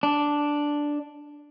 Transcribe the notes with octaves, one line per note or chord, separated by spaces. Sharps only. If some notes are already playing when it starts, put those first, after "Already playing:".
D4